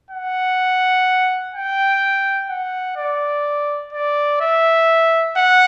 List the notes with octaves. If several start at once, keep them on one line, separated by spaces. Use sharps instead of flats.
F#5
G5
F#5
D5
D5
E5
F#5